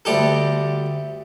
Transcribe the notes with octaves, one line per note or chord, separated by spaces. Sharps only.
D2 G3 G4 A4